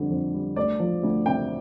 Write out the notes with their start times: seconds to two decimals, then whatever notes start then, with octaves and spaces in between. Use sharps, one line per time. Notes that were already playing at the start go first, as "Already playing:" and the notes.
Already playing: F2 D3 G3
0.10 F2
0.34 G3
0.56 D2 D5
0.80 F3
1.03 D2
1.26 C3 G5